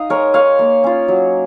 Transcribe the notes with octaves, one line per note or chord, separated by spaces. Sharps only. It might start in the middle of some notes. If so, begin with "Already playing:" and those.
Already playing: D#4 D#5 F5
G#3 A#4 C#5
D#4 C#5 F5
A#3
C#4 F4
F#3